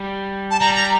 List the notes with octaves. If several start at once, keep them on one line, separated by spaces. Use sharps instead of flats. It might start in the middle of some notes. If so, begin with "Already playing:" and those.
Already playing: G3
A5
G3 A#5
A#5